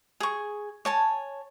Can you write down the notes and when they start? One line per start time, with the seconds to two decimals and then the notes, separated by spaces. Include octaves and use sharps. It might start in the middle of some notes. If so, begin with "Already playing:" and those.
0.20 G#4 C#6
0.85 C#5 G#5 A5